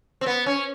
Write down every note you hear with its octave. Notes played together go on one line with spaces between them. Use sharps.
C4
B3
C#4